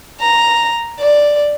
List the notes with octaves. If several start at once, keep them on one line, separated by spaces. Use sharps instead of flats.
A#5
D5